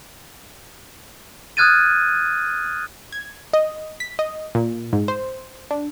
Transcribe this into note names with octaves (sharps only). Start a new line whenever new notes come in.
D#6 F6 F#6 G#6 A6 D#7
G#6
D#5
B6
D#5
A#2
G#2
C5
D4